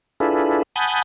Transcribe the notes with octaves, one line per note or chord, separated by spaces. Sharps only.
D4 E4 F4 G#4 A4 B4
F#5 G#5 A5 B5 D#6 G6